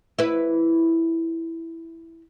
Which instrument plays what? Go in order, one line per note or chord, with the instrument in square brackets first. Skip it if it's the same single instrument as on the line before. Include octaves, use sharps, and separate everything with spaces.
[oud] E4 B4